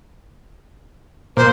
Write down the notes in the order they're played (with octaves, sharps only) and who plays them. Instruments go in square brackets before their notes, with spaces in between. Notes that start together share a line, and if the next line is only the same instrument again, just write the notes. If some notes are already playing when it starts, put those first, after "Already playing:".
[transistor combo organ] A#2 [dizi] C5